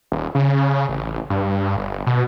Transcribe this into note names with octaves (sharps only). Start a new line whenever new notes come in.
D#1
C#3
A1
G2
G1
B2